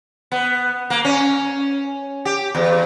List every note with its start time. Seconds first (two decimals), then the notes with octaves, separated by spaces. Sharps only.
0.32 B3
0.90 A#3
1.05 C#4
2.25 G4
2.55 E2